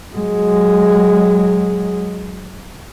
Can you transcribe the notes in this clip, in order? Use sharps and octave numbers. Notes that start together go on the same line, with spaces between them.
F#3 G#3